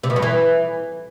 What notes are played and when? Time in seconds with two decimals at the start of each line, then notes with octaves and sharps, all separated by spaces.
0.03 C3
0.10 B2
0.16 G2
0.22 E3